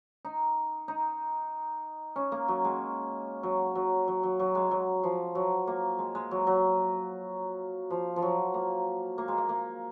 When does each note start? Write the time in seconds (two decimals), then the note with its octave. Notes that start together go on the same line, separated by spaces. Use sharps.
0.25 D#4
0.88 D#4
2.16 C#4
2.32 A#3
2.48 F#3
2.65 G#3
3.43 F#3
3.75 F#3
4.08 F#3
4.23 F#3
4.40 F#3
4.55 G#3
4.71 F#3
5.04 F3
5.35 F#3
5.67 A#3
5.99 G#3
6.15 G#3
6.31 F#3
6.47 F#3
7.90 F3
8.16 F3
8.22 F#3
8.54 A#3
9.18 A#3
9.28 G#3
9.38 A#3
9.49 A#3